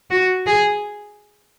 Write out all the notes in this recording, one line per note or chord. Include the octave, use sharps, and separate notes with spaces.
F#4
G#4